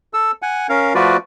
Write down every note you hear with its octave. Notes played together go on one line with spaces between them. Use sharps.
A4 E6
F#5 G#5
C#4 A#4 F5
F3 A3 F4 F#4 B4 D5